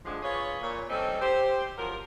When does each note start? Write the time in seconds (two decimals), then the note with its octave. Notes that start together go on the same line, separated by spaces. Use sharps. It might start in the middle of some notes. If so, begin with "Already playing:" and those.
0.05 A2 D3 F3 G#3 D4 G#4
0.22 F4 G#4 B4 C#5
0.62 A#2 C#5
0.89 G3 C4 C#4 D#4 A4
1.21 G4 C5
1.77 F3 F#3 F4 A#4